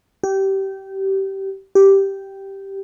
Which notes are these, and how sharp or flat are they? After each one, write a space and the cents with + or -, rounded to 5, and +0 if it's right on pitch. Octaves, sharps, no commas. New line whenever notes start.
G4 -20
G4 -5